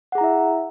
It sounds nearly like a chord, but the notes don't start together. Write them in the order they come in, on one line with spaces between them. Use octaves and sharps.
F#5 G#4 A#5 E4 E5